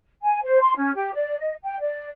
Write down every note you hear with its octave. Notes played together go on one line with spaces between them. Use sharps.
G#5
C5
C6
C#4
G4
D5
D#5
G5
D5